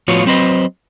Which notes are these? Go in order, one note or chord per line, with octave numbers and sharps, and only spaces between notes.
A2 F3 B3 F4 F#4 C#5
F#3 A3 C4 B4 C5 D#5